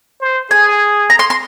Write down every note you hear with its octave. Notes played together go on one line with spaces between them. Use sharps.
C5
G#4 G#5
A#5
C6
C6